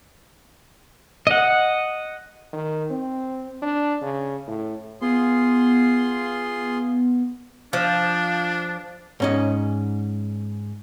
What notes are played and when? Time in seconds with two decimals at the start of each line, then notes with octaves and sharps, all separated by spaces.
1.27 D#5 F#5
2.53 D#3
2.91 C4
3.62 D4
4.02 C#3
4.47 A2
5.01 B3 F4 G#4 C6
7.73 F3 D4
9.20 G#2 C#4 D#5